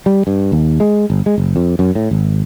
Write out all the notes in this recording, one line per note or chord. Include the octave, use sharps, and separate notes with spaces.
G3
G2
D#2
G#3
G1
G#3
F#1
F2
F#2
A2
G#1